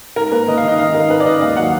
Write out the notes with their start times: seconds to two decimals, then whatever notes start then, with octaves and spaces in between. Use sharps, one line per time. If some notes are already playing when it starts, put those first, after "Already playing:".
0.16 G#2 A#4
0.32 A#3 B4
0.47 D#3 D#5
0.57 F5
0.63 D#3
0.68 D#5
0.79 G#2 F5
0.94 G#2 A#4
1.10 G#2 B4
1.20 D5
1.25 G#2 D#5
1.41 D#2 F5
1.56 F#3 F#5